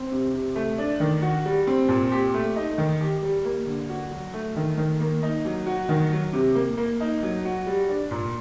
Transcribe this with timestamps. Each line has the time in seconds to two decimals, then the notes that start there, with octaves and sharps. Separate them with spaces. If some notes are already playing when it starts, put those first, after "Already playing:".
Already playing: C4
0.12 C3
0.33 C3
0.56 A3
0.78 D4
1.00 D#3
1.22 F#4
1.45 G3
1.67 C4
1.89 A#2
2.12 G4
2.34 A3
2.56 D#4
2.78 D#3
3.01 G4
3.22 G3
3.45 A#3
3.67 D3
3.89 F#4
4.11 F#3
4.34 A3
4.56 D#3
4.78 D#3
5.00 A#3
5.23 D#4
5.45 F#3
5.66 F#4
5.89 D#3
6.12 F#3
6.33 C3
6.55 A#3
6.77 A#3
7.00 D#4
7.23 F#3
7.45 F#4
7.67 G3
7.89 D4
8.11 A#2